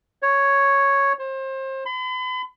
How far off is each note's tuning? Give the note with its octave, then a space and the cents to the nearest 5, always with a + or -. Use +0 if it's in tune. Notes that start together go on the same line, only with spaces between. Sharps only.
C#5 +0
C5 +30
B5 +40